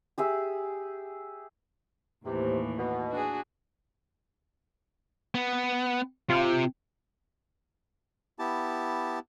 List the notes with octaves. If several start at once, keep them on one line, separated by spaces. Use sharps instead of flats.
G4 G#4 E5
D#2 A2 C3 E3
B2
D4 F#4 G#4
B3
C3 F4
B3 E4 G4 A5